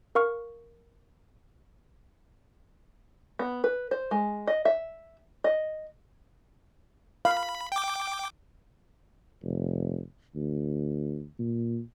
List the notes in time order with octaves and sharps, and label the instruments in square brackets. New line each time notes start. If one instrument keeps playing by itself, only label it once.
[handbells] A#4 F5 C#6 F6
[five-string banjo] B3
B4
C5
G#3
D#5
E5
D#5
[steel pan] F5 [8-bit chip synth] B5
[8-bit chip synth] G5 D6
[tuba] F1
D2
A#2